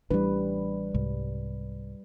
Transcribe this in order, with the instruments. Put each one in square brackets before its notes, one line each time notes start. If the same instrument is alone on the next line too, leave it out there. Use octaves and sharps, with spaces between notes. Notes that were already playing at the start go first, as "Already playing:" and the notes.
[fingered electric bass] A1 E3 D4 [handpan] G3 B4
[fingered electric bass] C2 G#2